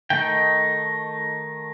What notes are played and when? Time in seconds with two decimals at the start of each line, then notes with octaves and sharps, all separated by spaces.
0.10 D#3 A3 D#4 G5